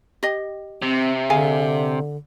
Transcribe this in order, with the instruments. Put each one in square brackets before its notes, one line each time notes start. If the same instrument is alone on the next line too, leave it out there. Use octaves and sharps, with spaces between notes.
[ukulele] G4 D#5
[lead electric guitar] C3 [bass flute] C4
[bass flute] D3 [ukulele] G#4 F5 G#5